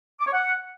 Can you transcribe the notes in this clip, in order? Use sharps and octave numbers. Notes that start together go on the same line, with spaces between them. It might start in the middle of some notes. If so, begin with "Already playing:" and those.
D6
C#5
F#5